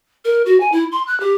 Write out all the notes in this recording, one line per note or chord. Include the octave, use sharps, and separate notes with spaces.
A#4
F#4
G#5
E4
C6
F#6
G4